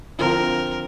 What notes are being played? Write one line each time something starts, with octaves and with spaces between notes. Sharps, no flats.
D3 F3 C4 F4 A#4